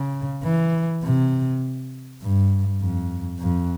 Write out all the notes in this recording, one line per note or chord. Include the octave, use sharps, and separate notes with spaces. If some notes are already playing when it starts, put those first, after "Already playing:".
Already playing: C#3
E3
C3
G2
F2
F2